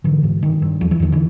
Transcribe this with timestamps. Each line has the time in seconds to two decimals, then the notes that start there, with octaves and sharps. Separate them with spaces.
0.04 G#2 D3 E3
0.24 G#2
0.43 G2 D#3
0.62 G2
0.81 E2 F3
0.91 E3
1.00 E2 D#3
1.12 D3 E3